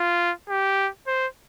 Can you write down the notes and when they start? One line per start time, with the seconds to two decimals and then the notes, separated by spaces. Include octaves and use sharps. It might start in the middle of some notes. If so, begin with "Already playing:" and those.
Already playing: F4
0.49 G4
1.07 C5